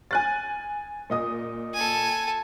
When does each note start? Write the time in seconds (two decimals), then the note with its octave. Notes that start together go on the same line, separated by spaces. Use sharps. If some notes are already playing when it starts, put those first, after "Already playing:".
0.11 G#5 F#6 A6
1.10 A#2 D#5 D#6
1.74 A4 G#5